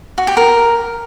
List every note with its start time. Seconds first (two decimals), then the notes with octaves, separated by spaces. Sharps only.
0.18 F#4
0.27 G4
0.37 A#4